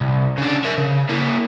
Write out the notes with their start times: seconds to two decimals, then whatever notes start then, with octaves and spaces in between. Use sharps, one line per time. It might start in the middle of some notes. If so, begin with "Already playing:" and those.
0.01 C2
0.38 C#3 D4
0.64 A#4 E5
0.77 C#3
1.09 A#3 E4